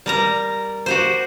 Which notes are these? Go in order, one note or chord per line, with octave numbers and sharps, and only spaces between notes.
G3 A#4 A#5
F#4 G4 C5